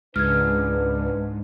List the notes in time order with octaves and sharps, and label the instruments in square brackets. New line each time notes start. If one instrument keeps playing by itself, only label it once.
[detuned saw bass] C#2 [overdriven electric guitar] G#2 [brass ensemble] D4 B4 [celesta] F6 G#6